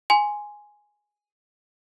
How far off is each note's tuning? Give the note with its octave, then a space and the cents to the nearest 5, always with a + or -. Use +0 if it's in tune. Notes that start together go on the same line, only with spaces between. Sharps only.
G#5 +0 C6 +0